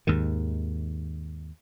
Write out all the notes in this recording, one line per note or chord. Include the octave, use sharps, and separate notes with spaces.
D#2 G#2 D#3